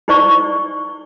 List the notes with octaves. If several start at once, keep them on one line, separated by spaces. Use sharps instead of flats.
D#4 E4 C5 D5 C#6